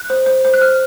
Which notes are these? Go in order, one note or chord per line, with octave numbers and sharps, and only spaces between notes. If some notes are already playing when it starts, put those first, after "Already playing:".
Already playing: F#6
C5
C5
C5
F#6
C5 F6